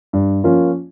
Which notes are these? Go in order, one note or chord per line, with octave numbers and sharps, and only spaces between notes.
G2
F3 A#3 C#4 F4